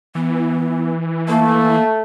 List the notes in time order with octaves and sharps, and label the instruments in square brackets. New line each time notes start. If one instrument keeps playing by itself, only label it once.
[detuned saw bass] E3 [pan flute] B3
[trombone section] A3 [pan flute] A#3